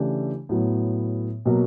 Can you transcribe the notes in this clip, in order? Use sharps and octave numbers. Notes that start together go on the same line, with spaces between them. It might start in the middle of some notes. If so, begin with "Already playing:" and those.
Already playing: C#3 E3 A3 D4 G4
A2 F#3 B3
B2 F#3 A#3